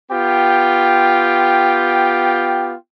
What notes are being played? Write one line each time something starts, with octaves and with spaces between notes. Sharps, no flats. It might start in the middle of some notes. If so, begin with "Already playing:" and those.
B3 F4 G4 G5